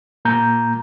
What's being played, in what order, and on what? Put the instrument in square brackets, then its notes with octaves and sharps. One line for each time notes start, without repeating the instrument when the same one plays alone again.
[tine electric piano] A#2 A#3 A#5 G6